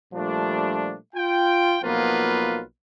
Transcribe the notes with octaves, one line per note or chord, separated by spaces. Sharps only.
A#2 F3 G3 A3 D4
F4 G5
B1 F3 A#3 B3 F4 B4